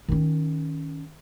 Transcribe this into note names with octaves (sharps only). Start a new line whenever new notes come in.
D#3 C#4